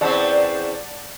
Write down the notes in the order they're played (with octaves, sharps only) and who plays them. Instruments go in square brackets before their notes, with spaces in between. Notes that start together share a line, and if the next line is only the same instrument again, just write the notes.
[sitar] E2 C4 C#4 [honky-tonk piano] D5 F#5 A5